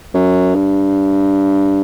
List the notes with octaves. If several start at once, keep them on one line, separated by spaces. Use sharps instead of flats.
F#2
G2